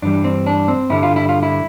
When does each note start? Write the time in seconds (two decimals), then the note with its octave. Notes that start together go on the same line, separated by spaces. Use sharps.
0.02 G2 E3 G3 D4
0.24 C4
0.46 D4
0.68 C4
0.90 G2 D3 G3 E4
1.03 F4
1.16 E4
1.29 F4
1.43 E4